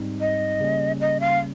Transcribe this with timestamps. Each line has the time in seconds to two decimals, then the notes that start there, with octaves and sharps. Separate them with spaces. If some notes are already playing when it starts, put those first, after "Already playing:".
Already playing: G#2 G3 C4 D#4
0.20 D#5
0.60 C#3 G3 A#3 C#4
1.00 D#5
1.20 F5